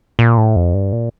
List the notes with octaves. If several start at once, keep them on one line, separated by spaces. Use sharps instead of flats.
A#2
A2
F2
G2
A#2